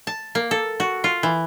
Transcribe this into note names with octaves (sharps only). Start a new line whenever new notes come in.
A5
A#3
A4
F#4
F4
E3